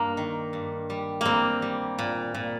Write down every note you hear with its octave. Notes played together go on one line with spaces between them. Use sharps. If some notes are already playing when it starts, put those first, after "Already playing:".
Already playing: G2 A#3
D#3
G2
G3
G3 A#3 C4
G3
A#2
A#2